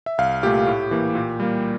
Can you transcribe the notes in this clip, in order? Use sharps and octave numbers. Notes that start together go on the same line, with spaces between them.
E5
C2 F5
A#2 A3 G4
A2
E3 A#3
A#2
G3 A#3